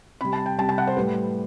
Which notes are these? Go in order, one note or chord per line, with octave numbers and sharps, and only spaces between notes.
C3 G3 B5
A5
G5
C3 G3 A5
A5
F#5
C5
A2 G3 B4